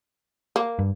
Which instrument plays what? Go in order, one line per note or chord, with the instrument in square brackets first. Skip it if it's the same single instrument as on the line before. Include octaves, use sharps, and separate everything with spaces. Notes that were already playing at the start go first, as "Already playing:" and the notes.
[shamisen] A#3
[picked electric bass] G2